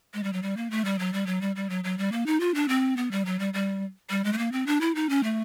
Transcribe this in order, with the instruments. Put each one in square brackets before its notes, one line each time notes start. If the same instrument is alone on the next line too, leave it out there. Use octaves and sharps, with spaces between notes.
[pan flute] G#3
G3
F#3
G3
A#3
A3
G3
F#3
G3
F#3
G3
G3
F#3
F#3
G3
A#3
D#4
F4
D4
C4
B3
G3
F#3
G3
G3
G3
G#3
A3
A#3
C4
D4
E4
D#4
C#4
A3